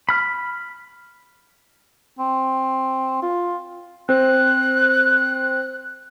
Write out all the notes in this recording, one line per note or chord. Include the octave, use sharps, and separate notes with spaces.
B5 F6
C4
F4
C4 C5 F#6